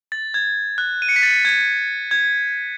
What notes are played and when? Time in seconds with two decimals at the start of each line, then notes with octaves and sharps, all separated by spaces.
0.12 A6
0.34 G#6
0.78 F#6
1.02 D#7
1.09 C#7
1.16 B6
1.23 A6
1.45 G#6
2.11 G#6